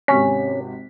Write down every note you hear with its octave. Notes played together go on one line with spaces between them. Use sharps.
G#1 C3 C#4 B6